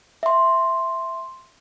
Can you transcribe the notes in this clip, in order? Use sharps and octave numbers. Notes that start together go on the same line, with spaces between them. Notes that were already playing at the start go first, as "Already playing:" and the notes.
E5 C6